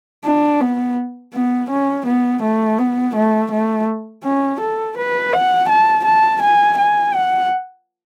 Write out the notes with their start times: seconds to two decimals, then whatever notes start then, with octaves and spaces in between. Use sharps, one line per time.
0.25 D4
0.61 B3
1.34 B3
1.70 C#4
2.06 B3
2.42 A3
2.78 B3
3.15 A3
3.51 A3
4.23 C#4
4.60 A4
4.97 B4
5.33 F#5
5.69 A5
6.05 A5
6.42 G#5
6.78 G#5
7.14 F#5